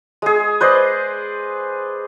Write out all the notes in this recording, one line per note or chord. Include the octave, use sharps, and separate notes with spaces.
G#3 G#4
B4 C5 D5 D#5